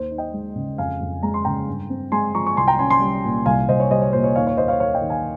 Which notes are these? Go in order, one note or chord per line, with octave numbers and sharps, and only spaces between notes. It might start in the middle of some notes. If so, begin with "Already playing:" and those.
Already playing: D#2 C5
D#4
D#5 G5
G#3
C#3
F2 F5 G#5
F2
G#3 A#5
C6
C#3 G5 A#5
G2
C4
G#3 G#5 C6
F3 A#5 C#6
C#6
C2 G#5 C6
G5 A#5
C#4 G#5 C6
G#5 C6
G3
A#2
C2 F5 G#5
C2 C5 D#5
C#5
G3 C5 D#5
C#5
A#2 C5
C#5
D#2 C#5 F5
C#5
D#2 C5 D#5
C#5 F5
A#3 C#5 F5
D#5 G5
D#3
F5 G#5